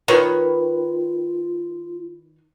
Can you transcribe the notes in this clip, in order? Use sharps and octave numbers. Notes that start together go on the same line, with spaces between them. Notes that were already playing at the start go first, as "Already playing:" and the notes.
D#3 F4 B4 C#5